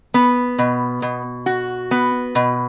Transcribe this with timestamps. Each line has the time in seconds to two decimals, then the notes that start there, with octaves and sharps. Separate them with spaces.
0.14 B3
0.59 B2
1.02 B2
1.46 F#4
1.91 B3
2.35 B2